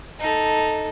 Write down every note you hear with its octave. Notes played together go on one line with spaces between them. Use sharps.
D#4 A4